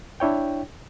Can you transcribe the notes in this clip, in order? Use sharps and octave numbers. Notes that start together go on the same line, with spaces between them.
D4 E4 C#5 G5